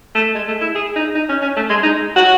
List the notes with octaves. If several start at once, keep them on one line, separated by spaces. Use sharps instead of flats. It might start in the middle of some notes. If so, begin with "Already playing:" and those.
A3
G#3
A3
E4
G#4
D#4
D#4
C#4
C#4
A3
G#3
D#4
F#4